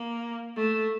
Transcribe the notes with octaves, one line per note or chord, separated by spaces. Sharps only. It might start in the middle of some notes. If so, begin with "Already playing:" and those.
Already playing: A#3
A3